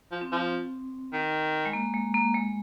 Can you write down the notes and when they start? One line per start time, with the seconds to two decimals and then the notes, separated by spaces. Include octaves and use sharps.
0.12 F3
0.21 C4
0.32 F3
1.13 D#3
1.65 G#3
1.73 A#3
1.94 G#3
2.14 A#3
2.34 G#3